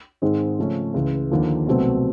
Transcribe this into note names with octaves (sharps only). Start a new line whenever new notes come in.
G#2 D#3 G#3 C4
C#3 F3 A3 C#4
C#2 C#3 E3
D#2 D3 F3 A#3
C2 B2 F#3 A3 C4